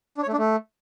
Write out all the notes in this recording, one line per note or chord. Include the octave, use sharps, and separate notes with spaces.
D4
C#5
A3
D4
A3